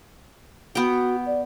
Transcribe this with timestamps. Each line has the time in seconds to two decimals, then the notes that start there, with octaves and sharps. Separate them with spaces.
0.75 B3 F#4 G5
1.26 D5